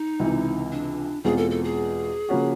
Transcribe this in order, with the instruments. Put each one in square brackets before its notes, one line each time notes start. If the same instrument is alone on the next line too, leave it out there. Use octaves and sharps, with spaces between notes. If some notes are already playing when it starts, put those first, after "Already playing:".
Already playing: [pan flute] D#4
[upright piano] C#2 C3 E3
[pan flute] D4
[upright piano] E2 B2 G#3 C4 F4 [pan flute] G#4
[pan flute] A4
A4
G#4
[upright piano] C#3 F3 A#3 C#4 F#4